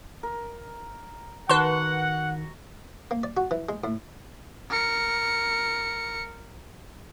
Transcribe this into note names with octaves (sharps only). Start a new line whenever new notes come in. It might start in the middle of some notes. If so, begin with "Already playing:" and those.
A#4
D#3 F#4 B4 F#5 A5 C6
A#3
D5
F#4
E3
G#3
A2
A#4 C#7